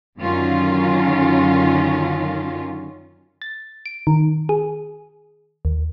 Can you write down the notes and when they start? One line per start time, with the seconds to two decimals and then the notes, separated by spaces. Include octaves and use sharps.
0.18 F#2 D3 D#3 F#3 C#4 F4
3.42 A6
3.86 D7
4.07 D#3
4.49 G#4
5.65 D#2